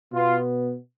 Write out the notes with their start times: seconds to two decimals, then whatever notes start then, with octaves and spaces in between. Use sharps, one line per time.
0.12 B2 B3 F4